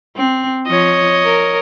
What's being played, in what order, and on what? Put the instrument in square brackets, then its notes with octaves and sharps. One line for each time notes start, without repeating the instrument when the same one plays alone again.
[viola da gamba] C4
[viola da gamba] F3 [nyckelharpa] C#5 D#5
[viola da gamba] A#4